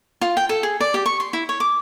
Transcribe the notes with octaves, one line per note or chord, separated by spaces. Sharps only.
F4
G5
A4
G#4
D5
G4
C#6
C6
E4
C#5
D6